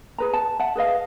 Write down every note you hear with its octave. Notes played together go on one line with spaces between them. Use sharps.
G#4 B4 A#5
A5
E5 F#5 A5
G#4 B4 D#5 F5